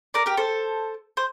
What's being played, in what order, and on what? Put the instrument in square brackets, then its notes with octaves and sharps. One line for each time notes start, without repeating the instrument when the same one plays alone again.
[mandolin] A#4 D5
G4 A#4
A4 C5
C5